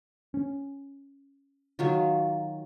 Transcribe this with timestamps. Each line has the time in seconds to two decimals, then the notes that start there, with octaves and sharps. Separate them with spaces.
0.34 C#4
1.79 D#3 F#3 F4